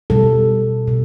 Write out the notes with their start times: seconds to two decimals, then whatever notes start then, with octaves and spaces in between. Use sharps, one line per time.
0.10 B2 G3 A4
0.88 B2